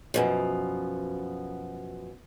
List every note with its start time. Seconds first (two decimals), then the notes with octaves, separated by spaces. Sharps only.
0.14 F#2 B2 F3